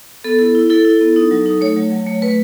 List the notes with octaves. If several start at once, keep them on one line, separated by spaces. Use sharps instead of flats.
B3 A4
E4 A4
E4
E4 A4
E4
B3
D#4
F#3
D#4
A3 C#5
F#3
F#3
A3
A3 B4